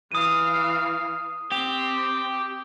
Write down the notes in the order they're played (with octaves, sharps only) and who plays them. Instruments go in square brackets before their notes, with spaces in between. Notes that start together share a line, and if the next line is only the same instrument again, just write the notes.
[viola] E3 F5 [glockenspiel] D#6 D#7
[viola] C4 [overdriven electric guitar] G4